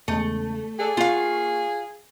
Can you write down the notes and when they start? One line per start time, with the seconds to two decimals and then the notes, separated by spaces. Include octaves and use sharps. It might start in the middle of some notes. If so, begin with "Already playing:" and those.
0.08 E2 C#3 G#3 A3
0.79 G#4 A4 D5 F#5
0.97 A#3 F4 F5 F#5 C#6